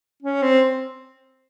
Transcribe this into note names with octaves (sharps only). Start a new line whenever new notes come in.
C#4
C4